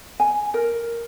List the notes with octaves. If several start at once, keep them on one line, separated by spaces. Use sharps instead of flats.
G#5
A#4